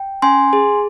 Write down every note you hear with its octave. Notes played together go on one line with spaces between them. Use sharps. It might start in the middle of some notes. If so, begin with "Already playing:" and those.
Already playing: G5
C#4 G#5 C6
G#4